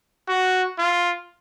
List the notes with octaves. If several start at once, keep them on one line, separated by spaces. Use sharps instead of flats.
F#4
F4